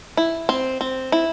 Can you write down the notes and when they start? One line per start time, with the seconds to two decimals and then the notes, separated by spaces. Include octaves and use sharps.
0.17 E4
0.49 C4
0.81 C4
1.12 E4